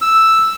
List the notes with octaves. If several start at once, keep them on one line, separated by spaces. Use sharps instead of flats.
E6